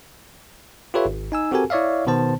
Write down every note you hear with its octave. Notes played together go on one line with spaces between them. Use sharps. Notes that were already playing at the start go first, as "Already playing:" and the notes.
F4 G4 A4 B4 C#5 E5
G#1
D#4 G#5 E6
C4 F#4 G4 A4 A#4 G#5
E4 C#5 D5 E5 F5
B2 D#3 B3 C5 A5